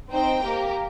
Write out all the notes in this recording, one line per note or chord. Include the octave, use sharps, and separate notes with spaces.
C4 D#4 C5 G5
A#3 G4 A#4